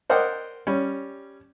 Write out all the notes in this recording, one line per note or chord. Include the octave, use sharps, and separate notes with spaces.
A#4 C5 D5 D#5 F#5 G5
G3 C#4